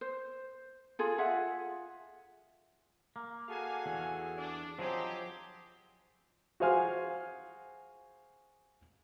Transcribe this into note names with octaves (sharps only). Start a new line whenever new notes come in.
C5
F4 G#4 A4
F4 G#4 E5 F#5
A#3
F#4 G#4 A4 F5 G#5
E2
D4
F3 F#3 C4 G4 G#4 D#5
F#4 G#4 C5 F5 G#5 F6